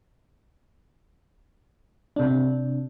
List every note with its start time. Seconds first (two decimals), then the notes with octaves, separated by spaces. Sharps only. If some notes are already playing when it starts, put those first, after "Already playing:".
2.16 C3 D4